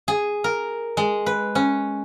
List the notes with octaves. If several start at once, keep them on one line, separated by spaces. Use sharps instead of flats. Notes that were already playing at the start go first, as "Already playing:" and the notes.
G#4
A#4
G#3
B4
C#4